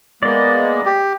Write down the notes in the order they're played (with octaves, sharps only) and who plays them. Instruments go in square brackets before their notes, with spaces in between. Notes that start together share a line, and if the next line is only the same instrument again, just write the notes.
[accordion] G#3 A#3 B3 [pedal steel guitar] D5 D#5
[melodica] G4